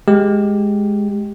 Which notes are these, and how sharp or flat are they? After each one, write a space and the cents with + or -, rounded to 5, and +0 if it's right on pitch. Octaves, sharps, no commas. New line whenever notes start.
G#3 +0 G4 +0